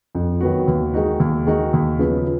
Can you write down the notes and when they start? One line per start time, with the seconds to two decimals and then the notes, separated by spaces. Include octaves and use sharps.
0.15 F2
0.41 D#3 F#3 B3 F#4
0.68 D#2
0.94 D#3 G#3 D#4 F#4
1.20 D#2
1.47 D#3 G#3 D#4 F#4
1.73 D#2
1.99 C#3 F3 B3